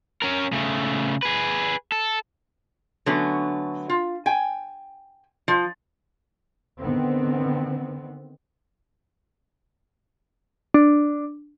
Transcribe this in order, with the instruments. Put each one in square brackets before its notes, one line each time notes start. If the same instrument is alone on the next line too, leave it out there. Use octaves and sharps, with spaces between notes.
[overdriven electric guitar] C#4 A#4
C#3 A3
G#4 B4
A4
[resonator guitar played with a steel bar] D3 F#3 A3 B3 C#4
F4
G5 G#5
F3
[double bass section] D3 D#3 B3 C4
[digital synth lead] D4